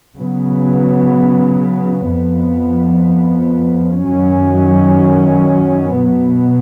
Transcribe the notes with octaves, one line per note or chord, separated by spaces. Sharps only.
C#3 F#3 B3
F2 F3 B3
F#2 D#3 F#3 C#4
B2 F#3 B3